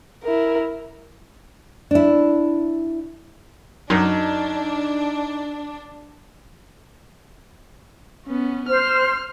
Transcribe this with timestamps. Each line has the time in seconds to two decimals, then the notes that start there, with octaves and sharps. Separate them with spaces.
0.24 E4 A#4
1.91 D4 E4
3.90 F#2 D4 D#4
8.26 B3 C#4
8.69 C5 F6